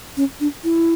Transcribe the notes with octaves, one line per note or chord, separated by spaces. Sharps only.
C#4
D4
E4